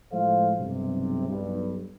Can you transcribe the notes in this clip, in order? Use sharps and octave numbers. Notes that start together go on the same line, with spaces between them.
A2 F3 G#3 A4 C5 F5
B1 G2 C3
B1 G2